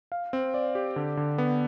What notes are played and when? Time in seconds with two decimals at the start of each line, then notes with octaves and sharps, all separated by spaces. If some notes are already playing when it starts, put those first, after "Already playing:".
0.12 F5
0.33 C4
0.54 D5
0.75 G4
0.96 D3
1.17 D3
1.38 B3